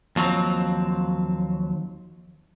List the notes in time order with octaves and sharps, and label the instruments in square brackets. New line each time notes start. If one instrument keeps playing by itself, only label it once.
[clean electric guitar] D#2 F3 F#3 C4